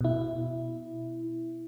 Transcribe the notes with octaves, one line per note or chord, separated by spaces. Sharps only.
B2 E4